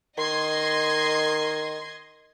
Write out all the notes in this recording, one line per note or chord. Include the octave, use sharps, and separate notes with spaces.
D#3 D#5 C6 G#6